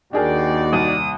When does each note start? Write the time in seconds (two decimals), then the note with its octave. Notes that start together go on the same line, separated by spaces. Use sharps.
0.13 D#2 D4 D#4 F#4 G#4 A#4 D5 G5
0.73 C2 D#6